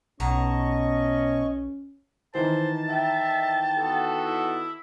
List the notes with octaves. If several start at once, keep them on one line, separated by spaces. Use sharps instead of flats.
B1 B2 C#4 D#5 A5 A#5 C#6
D#3 E3 C5 A5
E5 G5
B3 F#4 A4
E4